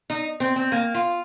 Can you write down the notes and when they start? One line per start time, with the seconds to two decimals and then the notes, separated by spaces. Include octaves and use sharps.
0.10 D#4
0.40 C4
0.56 C4
0.72 A#3
0.95 F4